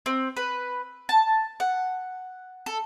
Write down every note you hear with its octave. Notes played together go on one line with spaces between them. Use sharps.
C4
B4
A5
F#5
A4